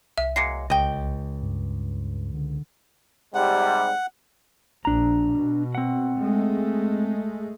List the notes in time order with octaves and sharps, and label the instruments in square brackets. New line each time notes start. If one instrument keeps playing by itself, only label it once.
[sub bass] C2 [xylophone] E5
[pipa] F#3 G#3 A#3 [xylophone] C7 C#7
[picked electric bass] C#2 [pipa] D#5 G5
[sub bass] G2
D3
[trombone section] G#2 C3 G3 [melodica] F#5
[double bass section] A#1 [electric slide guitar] D4 A#5
[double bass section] B2
[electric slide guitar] C4 F#5
[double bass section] G#3 A3